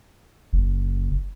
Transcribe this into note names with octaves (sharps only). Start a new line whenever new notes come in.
F#1